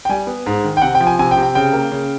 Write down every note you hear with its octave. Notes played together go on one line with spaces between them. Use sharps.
G5
G3 G#5
B3
G#2
D#3
G5
C3 F#5
G5
F3
G#5
C3 G#5
G5
C3
G5
C#3 G5
A#3
C#3